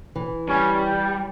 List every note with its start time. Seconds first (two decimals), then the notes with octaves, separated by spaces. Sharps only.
0.16 E3
0.49 G3 C#4
0.86 G5